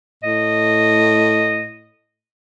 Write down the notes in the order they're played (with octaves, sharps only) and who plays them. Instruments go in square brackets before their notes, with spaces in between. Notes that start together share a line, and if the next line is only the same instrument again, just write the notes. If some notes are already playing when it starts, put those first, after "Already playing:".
[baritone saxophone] A2 [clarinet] D#5